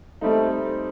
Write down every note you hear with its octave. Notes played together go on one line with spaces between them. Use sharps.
G3 A3 C4 D#4